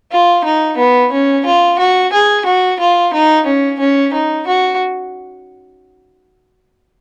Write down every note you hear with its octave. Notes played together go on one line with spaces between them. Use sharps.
F4
D#4
B3
C#4
F4
F#4
G#4
F#4
F4
D#4
C#4
C#4
D#4
F#4